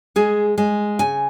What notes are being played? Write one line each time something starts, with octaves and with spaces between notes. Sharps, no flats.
G#3 G#4
G#3
C#3 G#5